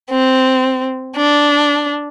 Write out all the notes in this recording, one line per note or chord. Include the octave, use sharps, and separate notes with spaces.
C4
D4